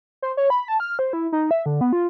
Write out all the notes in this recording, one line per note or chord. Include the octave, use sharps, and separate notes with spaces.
C5
C#5
B5
A5
F6
C5
E4
D#4
E5
D3
B3
F4